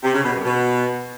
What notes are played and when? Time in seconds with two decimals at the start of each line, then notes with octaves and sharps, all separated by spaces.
0.04 C3
0.14 C#3
0.24 B2
0.33 F#2
0.43 B2